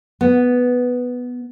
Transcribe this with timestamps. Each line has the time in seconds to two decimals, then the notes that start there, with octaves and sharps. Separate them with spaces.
0.21 B3